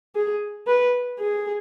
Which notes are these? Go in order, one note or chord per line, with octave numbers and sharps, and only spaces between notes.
G#4
B4
G#4